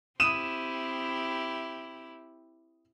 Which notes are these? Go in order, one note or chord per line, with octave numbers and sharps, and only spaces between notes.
C4 E4 G4 D#6 D#7 E7